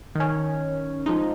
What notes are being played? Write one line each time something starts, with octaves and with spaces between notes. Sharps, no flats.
D#3 C#4
F3 G#3 D#4